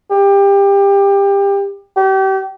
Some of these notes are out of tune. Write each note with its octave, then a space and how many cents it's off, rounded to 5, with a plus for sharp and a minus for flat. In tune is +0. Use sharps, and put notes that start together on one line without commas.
G4 +25
G4 -35